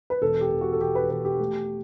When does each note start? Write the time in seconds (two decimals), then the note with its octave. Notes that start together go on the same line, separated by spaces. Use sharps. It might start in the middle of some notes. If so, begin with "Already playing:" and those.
0.10 B4
0.22 E1 A4
0.41 G4
0.51 E1
0.61 F#4
0.72 A4
0.80 E1 G4
0.95 B4
1.10 E1 B4
1.25 G4
1.40 A3